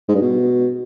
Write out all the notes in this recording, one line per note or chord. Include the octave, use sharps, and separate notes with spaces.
G#2
G2
B2